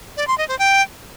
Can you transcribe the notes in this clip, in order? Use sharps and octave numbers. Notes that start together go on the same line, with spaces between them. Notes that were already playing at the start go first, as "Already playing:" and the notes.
D5
C6
D#5
C5
G5